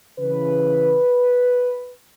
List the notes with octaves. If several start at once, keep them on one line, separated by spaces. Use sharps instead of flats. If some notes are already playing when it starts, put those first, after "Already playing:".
C#3 E3 B4